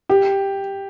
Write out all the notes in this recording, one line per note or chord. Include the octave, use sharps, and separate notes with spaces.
G4